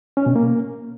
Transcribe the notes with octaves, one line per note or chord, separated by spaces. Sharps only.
C#4
B2
A#3